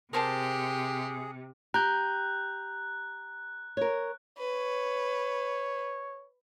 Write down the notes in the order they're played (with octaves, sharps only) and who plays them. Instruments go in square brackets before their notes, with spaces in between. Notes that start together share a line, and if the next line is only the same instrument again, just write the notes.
[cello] C3 [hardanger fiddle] G4 [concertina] G#4 [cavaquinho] A#4 C5 A5
[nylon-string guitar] G4 [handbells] A#5 G6 [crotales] F#6
[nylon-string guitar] A#4 C#5
[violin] B4 [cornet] C#5